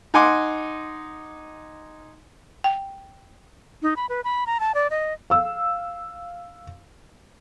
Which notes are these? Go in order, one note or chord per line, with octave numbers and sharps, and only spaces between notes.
D#4 F#5 G#5 C6 D6
G5
D#4
B5
B4
B5
A#5
A5
D5
D#5
F5 E6